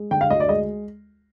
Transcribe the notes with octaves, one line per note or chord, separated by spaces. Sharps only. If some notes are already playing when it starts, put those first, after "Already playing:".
Already playing: G#3
D3 G5
F5
D2 D#5
D5
G#3 D#5